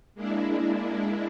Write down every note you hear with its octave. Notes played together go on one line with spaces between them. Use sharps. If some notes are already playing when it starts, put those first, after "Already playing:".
G#3 A#3 D4 E4